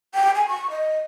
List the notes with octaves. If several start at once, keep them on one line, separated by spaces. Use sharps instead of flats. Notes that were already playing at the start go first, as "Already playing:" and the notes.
G5
G#5
C#6
D#5